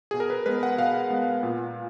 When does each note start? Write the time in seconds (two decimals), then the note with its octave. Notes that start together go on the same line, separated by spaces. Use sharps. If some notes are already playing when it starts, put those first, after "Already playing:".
0.11 B2 G#4
0.20 A#4
0.30 B4
0.46 G#3 B3 B4
0.63 F#5
0.78 B2 F5
1.10 G#3 B3
1.43 A#2